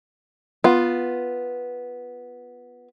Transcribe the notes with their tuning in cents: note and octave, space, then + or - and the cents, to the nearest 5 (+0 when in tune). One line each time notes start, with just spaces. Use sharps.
B3 -5 F4 +0